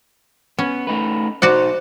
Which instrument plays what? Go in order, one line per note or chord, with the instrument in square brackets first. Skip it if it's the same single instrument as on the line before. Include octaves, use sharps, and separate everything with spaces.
[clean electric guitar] B3 [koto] C#4
[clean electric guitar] A3 D#4 B4
[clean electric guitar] B1 D#4 [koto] F#4 D5 F#5 [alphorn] C5